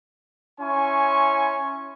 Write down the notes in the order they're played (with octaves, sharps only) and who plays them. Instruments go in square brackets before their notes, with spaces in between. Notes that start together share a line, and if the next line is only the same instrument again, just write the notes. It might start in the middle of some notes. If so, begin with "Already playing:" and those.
[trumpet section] C#4 E4 G#5 C6 C#6